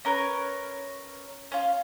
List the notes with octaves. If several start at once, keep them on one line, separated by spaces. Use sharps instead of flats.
C#4 A#4 B4 C#5
C#4 F4